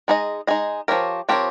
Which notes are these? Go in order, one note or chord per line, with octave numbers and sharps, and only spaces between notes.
G#3 D#4 G#4 D#5
G#3 D#4 G#4 D#5
F3 C4 G4 A#4 C#5
F3 C4 G4 A#4 C#5